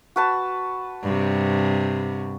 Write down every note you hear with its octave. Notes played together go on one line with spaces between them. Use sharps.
F#4 B4 A5
G2 C3